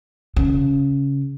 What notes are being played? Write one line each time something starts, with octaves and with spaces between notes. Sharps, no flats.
C#3